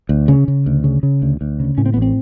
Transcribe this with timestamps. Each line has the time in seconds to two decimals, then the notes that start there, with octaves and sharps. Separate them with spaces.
0.09 D2
0.28 C#3 C#4
0.48 C#3
0.66 D2
0.84 C#3
1.03 C#3
1.22 D2
1.41 D2
1.60 C#3
1.78 A2 C#4
1.86 C4
1.94 A1 B3
2.02 C4